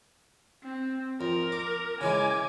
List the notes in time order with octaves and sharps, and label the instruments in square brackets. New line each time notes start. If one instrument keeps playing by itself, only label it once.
[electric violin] C4
[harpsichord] F2 [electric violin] A#4
[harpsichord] D6
[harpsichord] C#3 E3 G#3 [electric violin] G#5 D6